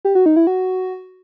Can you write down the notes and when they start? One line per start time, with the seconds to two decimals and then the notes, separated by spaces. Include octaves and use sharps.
0.05 G4
0.15 F#4
0.26 D#4
0.36 E4
0.47 F#4